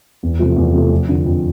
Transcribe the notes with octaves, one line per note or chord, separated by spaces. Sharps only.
E2
C3 F3 A3
E2
C3 F3 A3
F2
D3 F3
F2